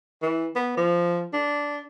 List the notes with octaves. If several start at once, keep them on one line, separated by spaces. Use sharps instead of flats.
E3
B3
F3
D4